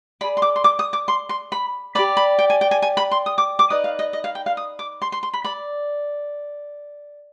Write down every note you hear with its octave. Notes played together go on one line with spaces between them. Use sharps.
G#4 D5 B5
C6
D6
C6
D6
D#6
D6
C6
C6
B5
G4 D5 B5
B5
G5
G#5
G5
G#5
G#5
B5
C6
D#6
D6
D6
D#4 B4 D5 D#6
F5
D#5
D#5
F5
G5
F5
D#6
D6
C6
C6
C6
B5
D5 B5